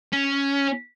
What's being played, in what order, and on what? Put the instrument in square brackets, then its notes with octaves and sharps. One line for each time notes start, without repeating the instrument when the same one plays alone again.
[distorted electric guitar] C#4